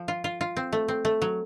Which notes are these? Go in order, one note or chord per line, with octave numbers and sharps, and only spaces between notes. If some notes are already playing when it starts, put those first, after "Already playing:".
Already playing: F3
F4
F4
F4
C4
A3
C4
A3
F#3